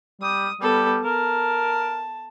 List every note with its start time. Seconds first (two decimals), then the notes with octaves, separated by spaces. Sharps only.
0.21 G3 D#6
0.61 G3 B3 A4
1.04 A#4 A5